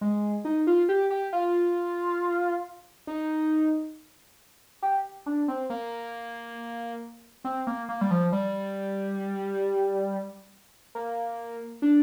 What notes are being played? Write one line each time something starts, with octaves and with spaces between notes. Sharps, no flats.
G#3
D#4
F4
G4
G4
F4
D#4
G4
D4
C4
A#3
C4
A#3
A#3
G3
F3
G3
A#3
D4